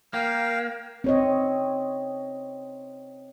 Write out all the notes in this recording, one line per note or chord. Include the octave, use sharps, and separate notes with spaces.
A#3 F5 G5
C4 C#5 D#5